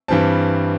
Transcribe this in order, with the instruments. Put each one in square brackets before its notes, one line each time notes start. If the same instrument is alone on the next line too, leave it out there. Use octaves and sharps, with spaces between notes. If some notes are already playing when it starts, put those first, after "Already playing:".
[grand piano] G2 E3 G3 C4 A5